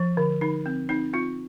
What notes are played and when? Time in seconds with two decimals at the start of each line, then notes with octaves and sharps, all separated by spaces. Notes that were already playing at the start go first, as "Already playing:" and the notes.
Already playing: F3
0.17 D3
0.41 D3 D#4
0.66 C4
0.89 C4 D#4
1.13 C4 F4